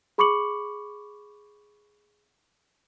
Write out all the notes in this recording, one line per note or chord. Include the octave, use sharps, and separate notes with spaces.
G#4 B5 C#6 D6 C#7 F#7